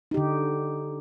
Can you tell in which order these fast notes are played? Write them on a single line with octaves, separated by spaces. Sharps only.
D#4 G4 D3